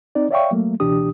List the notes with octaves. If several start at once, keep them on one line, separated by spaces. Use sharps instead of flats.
C4 D#4 D5
C#5 D5 E5 F5 G5 C#6
F#3 A3 A#3
C#2 B2 E3 D4 G4 D#6